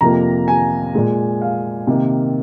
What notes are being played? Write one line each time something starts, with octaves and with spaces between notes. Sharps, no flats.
F2 C3 F3 A#3 A#5
G#5
A#2 G#3
F5
C3 D#3 A#3